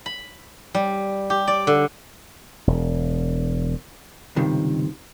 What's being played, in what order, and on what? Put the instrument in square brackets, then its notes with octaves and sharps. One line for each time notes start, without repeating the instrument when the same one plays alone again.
[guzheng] B5
G3
G4
D5
D3
[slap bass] E1
[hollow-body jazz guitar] C#2 G2 C3 D#3